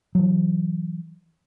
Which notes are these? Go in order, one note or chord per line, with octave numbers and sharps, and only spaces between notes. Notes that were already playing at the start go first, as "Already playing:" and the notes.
E3 F#3